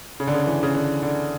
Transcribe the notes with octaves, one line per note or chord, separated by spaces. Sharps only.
C#3
D3
C#3
E3
C#3
D3
D3